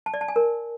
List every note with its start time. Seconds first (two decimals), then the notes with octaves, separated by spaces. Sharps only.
0.06 A5
0.14 D5
0.21 A5
0.28 G#5
0.36 A#4